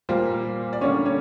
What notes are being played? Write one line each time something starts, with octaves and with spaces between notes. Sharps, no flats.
A#2 G3 A#3 C5
D5
D3 G3 A#3 C#4 C#5
C#4 C#5